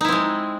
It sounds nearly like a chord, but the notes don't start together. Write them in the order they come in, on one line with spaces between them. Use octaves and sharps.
D#4 E4 C4 G#3